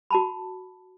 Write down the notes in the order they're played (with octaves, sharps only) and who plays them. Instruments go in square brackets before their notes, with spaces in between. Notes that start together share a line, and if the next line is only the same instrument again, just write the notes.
[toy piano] F#4 A5 B5